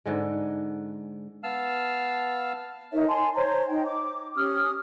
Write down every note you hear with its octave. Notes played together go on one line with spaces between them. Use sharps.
G#2 D3 G#3
B3 F5 A5 E6 F6
D#4 A#4 C#5 E5
G#5 A5 C6
C5 C#5 A#5
D#4 G5
D6
C#4 G4 D#6 F6